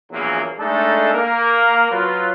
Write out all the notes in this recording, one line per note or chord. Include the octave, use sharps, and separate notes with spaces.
A#1 E2 E3 F#3 A#3 G#4
G#3 A3 D4 D#4 A4
A#3 A#4
F#3 F4 B4